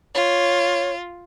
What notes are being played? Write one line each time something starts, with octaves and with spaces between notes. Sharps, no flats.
F4 C#5